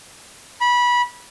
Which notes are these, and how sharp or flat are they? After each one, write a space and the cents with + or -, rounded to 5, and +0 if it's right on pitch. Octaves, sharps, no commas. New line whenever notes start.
B5 -20